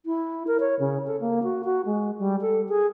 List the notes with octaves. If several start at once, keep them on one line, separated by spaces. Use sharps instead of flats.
E4
A#4
C#5
C#3
A4
A#3
F#4
F#4
G#3
G3
A4
G#4